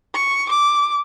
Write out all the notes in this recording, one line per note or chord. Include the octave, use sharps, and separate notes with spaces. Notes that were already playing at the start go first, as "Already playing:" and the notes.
C#6
D6